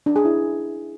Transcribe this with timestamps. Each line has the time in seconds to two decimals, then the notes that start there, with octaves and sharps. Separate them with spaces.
0.06 D4
0.16 G#4
0.25 E4